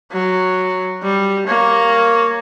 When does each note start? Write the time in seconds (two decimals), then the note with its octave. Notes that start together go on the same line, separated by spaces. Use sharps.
0.12 F#3
1.03 G3
1.47 A#3 C#5